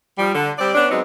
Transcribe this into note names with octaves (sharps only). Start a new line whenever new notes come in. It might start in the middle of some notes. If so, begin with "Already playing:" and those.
F3 G3
D3
G3 C4 D5
B3 C#4 D4
F#3 G#3 B3 C4 D#4